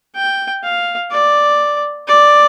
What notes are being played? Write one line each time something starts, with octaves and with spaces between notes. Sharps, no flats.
G5
F5
D5
D5